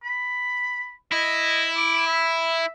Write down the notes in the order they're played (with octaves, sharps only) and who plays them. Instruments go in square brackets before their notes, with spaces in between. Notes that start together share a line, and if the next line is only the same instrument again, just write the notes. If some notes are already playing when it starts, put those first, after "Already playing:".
[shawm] B5
[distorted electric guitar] E4 [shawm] D#5
[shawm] D6
E5